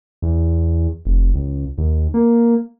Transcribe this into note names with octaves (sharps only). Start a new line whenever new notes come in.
E2
F1
C#2
D#2
A#3